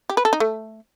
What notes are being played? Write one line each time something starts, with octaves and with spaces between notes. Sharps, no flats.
G4
B4
A4
D#4
A3